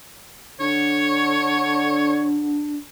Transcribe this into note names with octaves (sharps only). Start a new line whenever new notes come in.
D3 D4 C#5